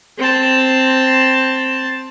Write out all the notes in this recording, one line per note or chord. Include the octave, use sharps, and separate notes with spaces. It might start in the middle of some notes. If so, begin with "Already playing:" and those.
C4 A5